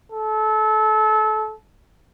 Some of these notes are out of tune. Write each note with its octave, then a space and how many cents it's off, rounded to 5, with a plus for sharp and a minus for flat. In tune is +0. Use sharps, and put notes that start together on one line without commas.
A4 -25